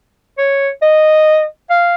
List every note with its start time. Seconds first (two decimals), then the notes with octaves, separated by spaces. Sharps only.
0.38 C#5
0.82 D#5
1.70 F5